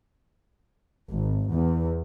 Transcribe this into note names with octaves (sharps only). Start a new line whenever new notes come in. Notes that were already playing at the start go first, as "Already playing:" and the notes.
G#1
E2